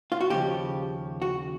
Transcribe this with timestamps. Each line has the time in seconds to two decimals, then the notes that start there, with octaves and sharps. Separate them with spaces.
0.12 F4
0.20 F#4
0.30 D#2 C#3 F3 G4
1.22 F#4